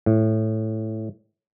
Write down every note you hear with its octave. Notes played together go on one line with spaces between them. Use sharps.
A2